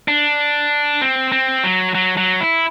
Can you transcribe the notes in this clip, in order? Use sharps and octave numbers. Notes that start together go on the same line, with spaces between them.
D4
C4
C4
F#3
F#3
F#3
E4